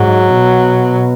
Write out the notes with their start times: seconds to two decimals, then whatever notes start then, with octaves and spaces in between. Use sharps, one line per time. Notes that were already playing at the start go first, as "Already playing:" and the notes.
Already playing: G#2 F#3
0.34 B2